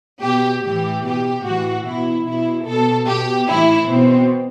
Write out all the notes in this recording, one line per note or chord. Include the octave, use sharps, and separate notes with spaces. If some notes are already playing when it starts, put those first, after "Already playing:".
B2 G4
A2 E3 G4
B2 G4
A2 E3 F#4
B2 E4
B2 E4
B2 A4
B2 G4
A2 E3 E4
B2 C4